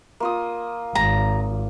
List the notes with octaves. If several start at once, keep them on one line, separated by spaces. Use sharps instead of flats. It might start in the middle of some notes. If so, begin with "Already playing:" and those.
A#3 F4 D#6
G#1 A#5